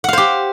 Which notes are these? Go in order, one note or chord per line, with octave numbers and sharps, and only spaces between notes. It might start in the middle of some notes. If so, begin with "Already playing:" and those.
G4 C5 F5 F#5